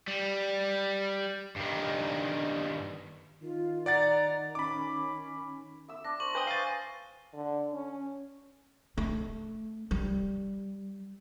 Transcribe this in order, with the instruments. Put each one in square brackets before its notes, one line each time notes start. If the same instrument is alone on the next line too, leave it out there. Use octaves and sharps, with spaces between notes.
[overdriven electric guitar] G3
G2 D#3
[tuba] D#3 [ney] F4
[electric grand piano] D5 F#5 A6 [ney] A#5
[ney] C#4 [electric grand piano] B5 D6
[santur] E5 E6
[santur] D4 [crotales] A#6
[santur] C5 [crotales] C#6 F#7
[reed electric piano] B4 G5 D#6 [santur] C5 [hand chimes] G#5 [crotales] G6 G7
[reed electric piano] F5 A6 [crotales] C7 D#7
[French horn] D3
C#4
[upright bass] A3
G3